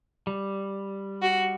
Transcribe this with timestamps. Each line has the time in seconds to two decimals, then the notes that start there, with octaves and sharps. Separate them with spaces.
0.27 G3
1.22 F#4